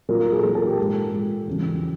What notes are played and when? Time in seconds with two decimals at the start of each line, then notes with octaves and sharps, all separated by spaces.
0.09 A#2 F#3 A#4
0.20 A#4
0.32 G#4
0.39 A4
0.43 A#2 F#3 A#4
0.55 A4
0.67 G4
0.78 G#2 F3 G4
1.12 G#2 F3
1.48 E2 C#3 F#3